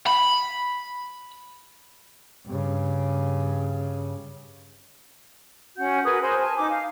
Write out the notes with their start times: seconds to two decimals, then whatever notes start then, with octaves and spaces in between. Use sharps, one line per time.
0.07 B5
2.46 G2 C#3
5.77 C#4 F#4 F#5 G6
6.04 F#4 G#4 A#4 B4
6.22 A#4 C5 G#5 B5
6.41 G#5 A5
6.58 D#4 D6
6.71 F5